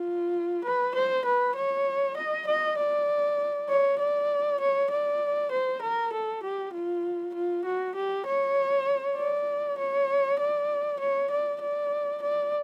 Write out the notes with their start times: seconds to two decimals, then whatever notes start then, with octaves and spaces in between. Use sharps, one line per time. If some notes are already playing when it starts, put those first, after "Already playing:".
Already playing: F4
0.65 B4
0.95 C5
1.26 B4
1.56 C#5
2.17 D#5
2.47 D#5
2.78 D5
3.69 C#5
3.99 D5
4.60 C#5
4.91 D5
5.52 C5
5.82 A#4
6.13 A4
6.43 G4
6.74 F4
7.35 F4
7.65 F#4
7.95 G4
8.26 C#5
9.17 D5
9.78 C#5
10.39 D5
11.00 C#5
11.31 D5
11.61 D5
12.22 D5